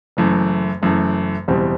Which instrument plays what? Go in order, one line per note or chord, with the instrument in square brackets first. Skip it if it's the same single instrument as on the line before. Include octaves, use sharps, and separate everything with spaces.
[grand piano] F#1 F#2 E3 A3
F#1 F#2 E3 A3
F#1 E2 B2 G3 C4